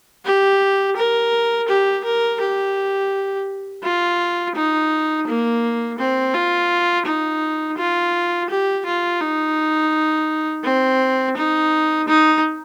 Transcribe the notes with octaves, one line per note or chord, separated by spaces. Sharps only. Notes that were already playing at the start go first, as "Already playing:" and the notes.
G4
A#4
G4
A#4
G4
F4
D#4
A#3
C4
F4
D#4
F4
G4
F4
D#4
C4
D#4
D#4